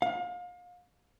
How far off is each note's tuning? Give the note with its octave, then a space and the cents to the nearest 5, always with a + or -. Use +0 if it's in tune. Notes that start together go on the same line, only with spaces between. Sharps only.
F5 +35